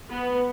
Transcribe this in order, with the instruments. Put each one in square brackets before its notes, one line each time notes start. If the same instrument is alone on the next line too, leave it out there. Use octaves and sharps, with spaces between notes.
[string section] B3